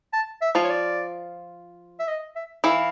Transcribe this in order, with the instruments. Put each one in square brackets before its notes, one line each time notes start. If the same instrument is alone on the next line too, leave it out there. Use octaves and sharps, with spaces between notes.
[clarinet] A5
E5
[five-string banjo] F3 F4
[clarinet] C#5
D5
E5
D#5
E5
[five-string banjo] E3 E4 [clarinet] F5